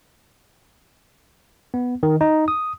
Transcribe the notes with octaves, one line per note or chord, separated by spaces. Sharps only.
B3
D#3
D#4
D#6